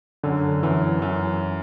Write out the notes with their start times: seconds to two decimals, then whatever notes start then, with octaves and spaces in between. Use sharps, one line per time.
0.23 F#2 D3
0.63 F#2 E3
1.01 F#2 E3